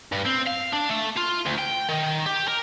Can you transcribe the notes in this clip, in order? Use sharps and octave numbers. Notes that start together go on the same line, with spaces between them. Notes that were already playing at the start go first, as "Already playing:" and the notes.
G2
C4
F5
D4
A3
F4
D2
G5
D#3
G4
A#4